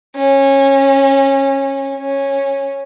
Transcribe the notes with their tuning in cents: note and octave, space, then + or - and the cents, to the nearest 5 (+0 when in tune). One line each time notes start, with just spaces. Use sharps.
C#4 -20
C#4 -10